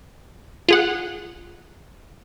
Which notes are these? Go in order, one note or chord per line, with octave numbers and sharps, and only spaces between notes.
F4 G#4 F#5